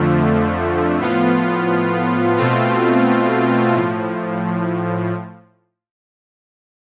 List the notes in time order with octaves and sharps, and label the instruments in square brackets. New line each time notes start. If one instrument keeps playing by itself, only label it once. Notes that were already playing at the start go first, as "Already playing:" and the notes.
Already playing: [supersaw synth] F2 D3 F3 A3
A2 F3 B3 F4
B2 A3 C4 F4
A2 F3